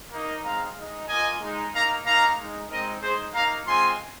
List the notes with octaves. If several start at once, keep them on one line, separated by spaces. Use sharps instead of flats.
A#3 D#4
G#3 C4 D#4 F5 A#5
G#3 D#4
A#3 F4 D#5 G#5
G#3 D#4
A#3 D#4 F5 A#5
A#3 D#4 F5 A#5
G#3 D#4
G#3 C4 D#4 A#4 D#5
G#3 D#4 G#4 C5
A#3 D#4 F5 A#5
G#3 C4 F4 G#5 C6